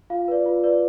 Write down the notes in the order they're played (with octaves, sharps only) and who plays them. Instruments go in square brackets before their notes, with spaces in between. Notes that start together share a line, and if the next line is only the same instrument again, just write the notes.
[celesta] F4 F5
B4 D5
F4
B4 D5